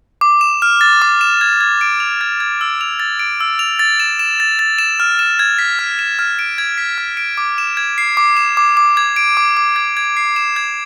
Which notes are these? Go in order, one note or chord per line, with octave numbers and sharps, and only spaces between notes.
D6
E7
F6
A6
D6
E7
G#6
G#6
D7
F7
G#6
G#6
E6
F7
A6
D7
E6
F7
A6
E7
E7
A6
A6
E7
F6
E7
G#6
B6
F6
E7
F6
D7
G#6
B6
F6
D7
D6
E7
G#6
C7
D6
E7
D6
D6
G#6
D7
D6
D6
G#6
G#6
C7
E7
G#6